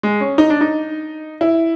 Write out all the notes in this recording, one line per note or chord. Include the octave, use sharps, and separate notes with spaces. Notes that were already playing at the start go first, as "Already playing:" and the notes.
G#3
C#4
D#4
D4
D#4
E4